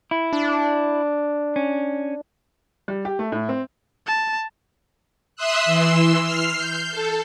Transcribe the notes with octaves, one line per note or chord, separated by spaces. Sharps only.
E4
D4
C#4
G3
G4
A3
A2
C4
A5
E5 C6 D#6 E6 F#6
E3 C6 E6
F6 C7
G6
A4